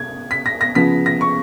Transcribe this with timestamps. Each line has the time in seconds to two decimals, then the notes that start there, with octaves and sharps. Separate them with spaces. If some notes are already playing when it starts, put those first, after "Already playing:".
Already playing: G#6
0.31 B6
0.46 A#6
0.61 A#6
0.75 C#3 F3 B3 B6
1.06 A#6
1.21 C#6